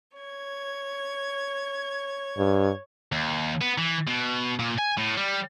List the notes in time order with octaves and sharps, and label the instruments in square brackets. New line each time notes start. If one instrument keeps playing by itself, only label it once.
[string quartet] C#5 G#6
[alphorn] G2
[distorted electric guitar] D#2
B3
E3
B2
A#2
G#5
A2
G3